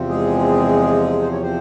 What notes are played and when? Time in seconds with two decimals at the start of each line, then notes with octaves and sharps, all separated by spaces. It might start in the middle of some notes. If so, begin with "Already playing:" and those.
Already playing: E2 C3 F3 C4
0.10 G#3 G#4
1.22 C5
1.32 C#5
1.42 C4 C5